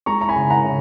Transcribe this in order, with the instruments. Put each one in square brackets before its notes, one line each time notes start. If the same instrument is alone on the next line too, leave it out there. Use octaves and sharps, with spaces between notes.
[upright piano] G#3 A#5 C#6
A#5
G#5 B5
C#3
F#5 A#5
C#3